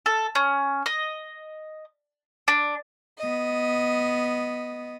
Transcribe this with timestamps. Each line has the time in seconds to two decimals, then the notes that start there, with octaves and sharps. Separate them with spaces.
0.06 A4
0.35 C#4
0.86 D#5
2.48 D4
3.19 B3 D#5